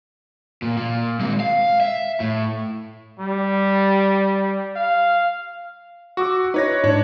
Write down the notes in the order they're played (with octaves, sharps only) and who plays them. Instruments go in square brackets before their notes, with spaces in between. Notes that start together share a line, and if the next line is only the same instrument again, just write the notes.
[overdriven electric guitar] A#2
A#2
G#3 C4
F5
E5
A2
[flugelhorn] G3
F5
[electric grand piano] F#4 [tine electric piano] C#6 D6 E6
[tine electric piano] D#4 E4 [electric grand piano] B4 C#5 A#6
[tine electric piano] G#2 [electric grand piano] D4 C#5